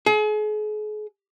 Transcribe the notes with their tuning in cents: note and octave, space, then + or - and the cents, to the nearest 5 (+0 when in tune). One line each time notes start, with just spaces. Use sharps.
G#4 +40